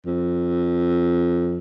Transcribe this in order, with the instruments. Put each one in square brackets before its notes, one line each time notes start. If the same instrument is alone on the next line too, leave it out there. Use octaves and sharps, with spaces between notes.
[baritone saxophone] F2